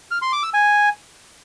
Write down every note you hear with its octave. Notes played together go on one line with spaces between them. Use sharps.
F6
C6
D6
E6
G#5